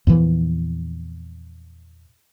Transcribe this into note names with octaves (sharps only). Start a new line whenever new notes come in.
E2 A#2 E3 F3